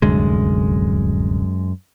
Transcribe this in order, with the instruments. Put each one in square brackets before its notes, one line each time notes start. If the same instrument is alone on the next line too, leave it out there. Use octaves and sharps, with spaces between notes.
[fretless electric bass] D1 C2 D3 [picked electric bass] F#2 G#3